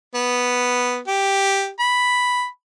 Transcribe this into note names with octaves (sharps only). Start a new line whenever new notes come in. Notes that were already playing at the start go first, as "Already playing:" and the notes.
B3
G4
B5